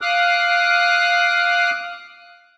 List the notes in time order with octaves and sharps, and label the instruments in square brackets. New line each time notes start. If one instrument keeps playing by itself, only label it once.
[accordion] F5 D6 D#6 F6 F#6